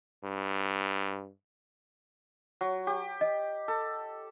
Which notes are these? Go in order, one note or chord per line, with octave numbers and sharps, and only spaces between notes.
G2
F#3
G4
D#5
A4